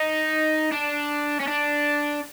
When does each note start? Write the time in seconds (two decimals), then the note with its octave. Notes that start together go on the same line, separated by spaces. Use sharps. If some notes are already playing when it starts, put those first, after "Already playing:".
Already playing: D#4
0.72 D4
1.40 C#4
1.48 D4